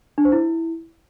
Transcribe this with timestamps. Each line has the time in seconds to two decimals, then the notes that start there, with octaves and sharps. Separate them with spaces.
0.18 D4
0.25 C5
0.32 E4